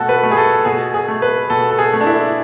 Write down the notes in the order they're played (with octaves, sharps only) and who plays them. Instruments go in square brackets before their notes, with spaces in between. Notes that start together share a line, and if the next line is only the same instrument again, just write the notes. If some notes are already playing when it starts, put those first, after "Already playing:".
Already playing: [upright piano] B2 A3 F#4 A4
B4
A3
G#4
A4
B2 G#4
G#4
A3
B4
B2 A4
A4
G#4
A3
D4
E4